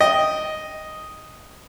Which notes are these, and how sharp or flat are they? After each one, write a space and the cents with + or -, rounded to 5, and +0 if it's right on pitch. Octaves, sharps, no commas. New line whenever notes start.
D#5 +0 G5 +0 D#6 +5